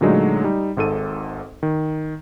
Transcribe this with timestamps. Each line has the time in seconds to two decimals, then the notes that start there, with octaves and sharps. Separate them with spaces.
0.01 A#2 D3 F#3 G#3 A3 D#4
0.44 G3 D#4
0.77 G#1 G#2 A4 D#7
1.63 D#3